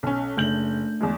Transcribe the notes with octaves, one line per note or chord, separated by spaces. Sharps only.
B1 C#4
F#1 A3 D4 G6 F#7
E2 G#3